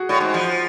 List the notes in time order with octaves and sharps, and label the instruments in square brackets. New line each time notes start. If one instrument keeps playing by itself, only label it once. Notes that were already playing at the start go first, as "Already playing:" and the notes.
Already playing: [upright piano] F#4 G#4
[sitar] A2
G#2
F3